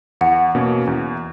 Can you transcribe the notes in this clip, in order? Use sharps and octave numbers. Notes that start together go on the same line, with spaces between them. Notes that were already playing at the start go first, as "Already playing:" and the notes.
E2 F#5
B2 A#3 C#4
E2